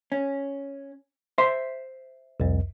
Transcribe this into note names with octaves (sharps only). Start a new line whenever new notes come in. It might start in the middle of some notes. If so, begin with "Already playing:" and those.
C#4
C5 E5 C6
C2 F2